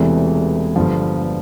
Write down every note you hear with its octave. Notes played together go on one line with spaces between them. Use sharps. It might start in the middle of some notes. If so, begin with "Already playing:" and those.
Already playing: E1 E2 C3 E3 A3
G1 G2 D3 F3